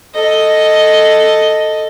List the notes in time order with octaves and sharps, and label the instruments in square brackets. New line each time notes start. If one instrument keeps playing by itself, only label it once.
[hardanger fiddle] A4 D#5